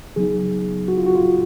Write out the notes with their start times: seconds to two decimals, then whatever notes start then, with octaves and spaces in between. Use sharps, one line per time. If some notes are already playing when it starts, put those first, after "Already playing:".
0.16 C#3 F#3 B3 D#4 G#4
0.88 F#4
0.97 F4
1.06 F#4
1.15 F4